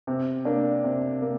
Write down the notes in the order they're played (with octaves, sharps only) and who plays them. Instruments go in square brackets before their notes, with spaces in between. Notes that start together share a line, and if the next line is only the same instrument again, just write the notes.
[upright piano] C3
A#3 D4
C3
A#3